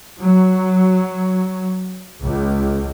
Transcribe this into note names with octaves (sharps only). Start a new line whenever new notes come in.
F#3
C#2